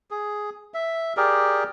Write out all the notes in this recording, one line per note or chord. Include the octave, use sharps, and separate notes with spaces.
G#4
E5
G4 G#4 A#4 D5